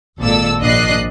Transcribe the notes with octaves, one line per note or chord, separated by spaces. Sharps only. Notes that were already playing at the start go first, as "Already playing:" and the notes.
G#1 A#2 A4 D5 E6
A#1 D4 D#5 F#6 C7